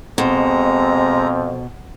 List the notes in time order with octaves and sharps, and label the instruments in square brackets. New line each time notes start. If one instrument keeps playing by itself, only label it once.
[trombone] F2 [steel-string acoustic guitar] B2 [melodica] G#3 A#5 [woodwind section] C4